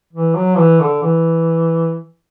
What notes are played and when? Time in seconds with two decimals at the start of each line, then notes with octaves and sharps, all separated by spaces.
0.13 E3
0.35 F#3
0.58 E3
0.80 D3
1.03 E3